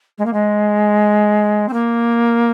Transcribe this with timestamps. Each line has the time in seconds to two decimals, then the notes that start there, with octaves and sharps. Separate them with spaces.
0.18 G#3
0.25 A#3
0.33 G#3
1.68 C4
1.73 A#3